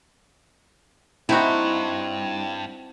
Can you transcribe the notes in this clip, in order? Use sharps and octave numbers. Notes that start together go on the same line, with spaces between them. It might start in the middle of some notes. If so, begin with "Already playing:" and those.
G2 C4 D#4 E4 F#4